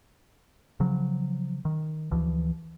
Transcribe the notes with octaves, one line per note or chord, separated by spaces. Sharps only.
C#3 F3 F#3
D#3
D2 E3 F3